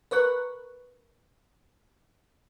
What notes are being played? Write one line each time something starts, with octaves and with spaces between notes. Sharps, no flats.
A#4 B4 C#6 F#6